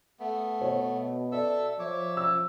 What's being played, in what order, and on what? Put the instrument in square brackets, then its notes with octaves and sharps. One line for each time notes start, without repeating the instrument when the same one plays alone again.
[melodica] A3 B3
[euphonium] B2 [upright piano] C#5
[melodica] A4 E5 E6 [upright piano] D5
[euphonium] F3 [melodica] C#5 E5 D6
[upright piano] E6